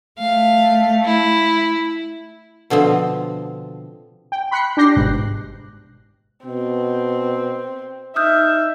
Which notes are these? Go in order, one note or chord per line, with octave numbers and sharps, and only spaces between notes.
A3 F5
E4
B2 D3 F3 C4
G5
B5 C6 F#6 B6 C#7
D4 G4 D6 G6 A#6 C7
G1 G#2 B2 F#6
B2 C4
D#4 E5 D#6 F6 G6